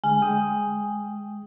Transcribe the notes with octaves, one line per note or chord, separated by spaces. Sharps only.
D3 G#3 G#5
G#3 G5 D#6